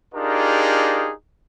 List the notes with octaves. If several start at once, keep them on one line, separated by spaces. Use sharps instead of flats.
D4 D#4 F4 G4 G#4 A#4